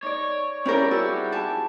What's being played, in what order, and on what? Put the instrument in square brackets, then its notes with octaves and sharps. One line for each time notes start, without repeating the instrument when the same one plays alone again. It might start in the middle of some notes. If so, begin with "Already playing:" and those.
[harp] D#4 D5 [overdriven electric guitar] C#5
[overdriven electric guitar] G3 [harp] C4 B5 [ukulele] C#4 E4 A#4
[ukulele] E4 [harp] F#4 G#4 E6
[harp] G#5 [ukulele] A5